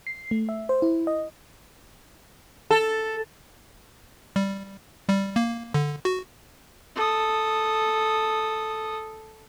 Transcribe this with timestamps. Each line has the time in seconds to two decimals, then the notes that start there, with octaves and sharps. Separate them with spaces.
0.07 C7
0.31 A3
0.49 E5
0.69 C5
0.82 E4
1.07 D#5
2.71 A4
4.36 G3
5.09 G3
5.36 A#3
5.74 D3
6.05 F#4
6.96 A4 D#6